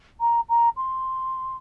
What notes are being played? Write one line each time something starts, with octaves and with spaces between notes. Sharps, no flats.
A#5
A#5
C6